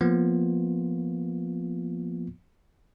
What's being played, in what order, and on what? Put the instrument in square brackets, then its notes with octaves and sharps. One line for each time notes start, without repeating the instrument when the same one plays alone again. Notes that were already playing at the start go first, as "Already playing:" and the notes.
[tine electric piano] F3 A#3 B3 F4